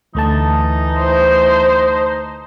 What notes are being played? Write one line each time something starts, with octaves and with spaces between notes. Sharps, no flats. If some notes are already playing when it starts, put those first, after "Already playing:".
D2 E3 A3 D#4 A5
C5